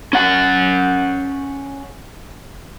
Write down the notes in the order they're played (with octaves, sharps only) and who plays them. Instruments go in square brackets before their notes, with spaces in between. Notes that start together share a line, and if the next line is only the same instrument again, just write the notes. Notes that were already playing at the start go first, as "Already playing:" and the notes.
[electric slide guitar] C#4 F#5